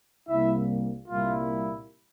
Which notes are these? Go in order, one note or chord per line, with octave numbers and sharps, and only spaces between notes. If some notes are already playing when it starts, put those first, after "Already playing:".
C2 C3 G3 A#3 E4 E5
C2 A#2 G3 A#3 E4 F4